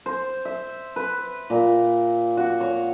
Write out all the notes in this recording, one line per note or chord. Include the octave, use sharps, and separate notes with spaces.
C5
E5
B4
A#2
F#4
C#5